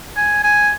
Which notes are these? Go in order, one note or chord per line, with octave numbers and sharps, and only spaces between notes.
G#5
G#5